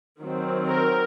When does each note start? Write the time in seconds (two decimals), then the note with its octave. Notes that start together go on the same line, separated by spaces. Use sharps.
0.21 D#3 F#3 C4
0.68 A#4